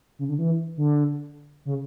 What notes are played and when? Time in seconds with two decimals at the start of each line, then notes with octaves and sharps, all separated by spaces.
0.19 C#3
0.29 D3
0.38 E3
0.77 D3
1.65 C#3